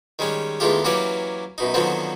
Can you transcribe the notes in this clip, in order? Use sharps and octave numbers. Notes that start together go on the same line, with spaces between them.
D#3 G3 G#3 C#4
E2 D#3 G#3 A3 F4 G4
E3 F#3 A#3 C#4 G4 D5
F#2 B2 D#4
D3 D#3 F3 F#3 B3 C4